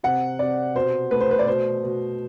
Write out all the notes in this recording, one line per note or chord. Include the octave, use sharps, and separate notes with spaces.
C3 F#5
C3 D5
B2 C5
A3 B4
C5
B4
D5
B2 C5
B2